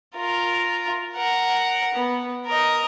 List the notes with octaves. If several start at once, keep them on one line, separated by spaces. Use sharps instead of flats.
F4 A#4
A#4 F#5
B3
A#4 D#5